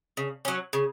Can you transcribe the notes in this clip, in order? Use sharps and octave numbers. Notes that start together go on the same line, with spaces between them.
C#3
F#3 C#4
C#3